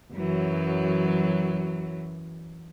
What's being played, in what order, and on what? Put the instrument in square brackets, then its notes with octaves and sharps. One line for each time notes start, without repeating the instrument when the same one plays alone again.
[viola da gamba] F#2 E3 F#3